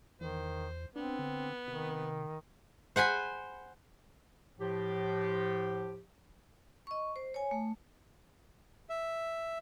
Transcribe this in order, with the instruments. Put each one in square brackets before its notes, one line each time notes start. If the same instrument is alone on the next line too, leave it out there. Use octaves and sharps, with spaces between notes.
[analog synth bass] E2 [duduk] D#3 [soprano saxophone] C5
[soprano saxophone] B3 [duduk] C4 [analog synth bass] D4
[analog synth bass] D3
[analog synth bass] C3 [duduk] D#3
[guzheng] C5 F#5 G#5 B5
[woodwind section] A2 F3 G4
[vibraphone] D#5 C#6
C5
C#5 G#5
A3
[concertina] E5